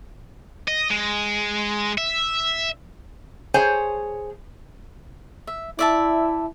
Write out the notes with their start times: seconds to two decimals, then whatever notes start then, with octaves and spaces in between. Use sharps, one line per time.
0.68 D#5
0.90 G#3
1.98 E5
3.54 G#4 C5 C#5 G#5
5.47 E5
5.79 E4 D5 E5 A5